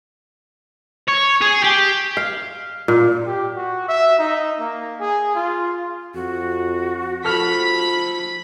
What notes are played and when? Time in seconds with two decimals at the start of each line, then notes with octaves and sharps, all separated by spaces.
1.08 C#5
1.42 G#4
1.64 G4
2.17 F5
2.88 A#2
3.26 G4
3.55 F#4
3.88 E5
4.19 D#4
4.59 A#3
5.00 G#4
5.35 F4
6.14 F2 F#4
7.25 F3 A4 B5 F6 B6 F7